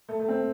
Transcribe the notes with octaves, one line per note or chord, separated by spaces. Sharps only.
A3
A3
C4